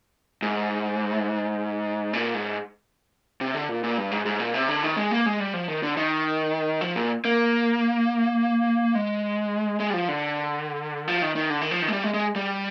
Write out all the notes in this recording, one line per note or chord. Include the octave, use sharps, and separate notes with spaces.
G#2
A#2
G#2
C3
D3
A#2
A#2
G2
G#2
G#2
A#2
C3
D3
D#3
G#3
A#3
G#3
G3
F3
D#3
D3
D#3
F3
A#2
A#3
G#3
G#3
G3
F3
D3
F3
D#3
D#3
D3
D#3
F3
D#3
G#3
G3
G#3
G#3
G3